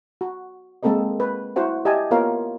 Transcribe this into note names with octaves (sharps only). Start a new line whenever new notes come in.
F#4
G#3 A#3 C4 A4 A#4 D#5
B4
E4 F#4 C5 F#5
G4 D#5 E5 G#5 A5
A#3 B3 F4 A#4 C#5 F5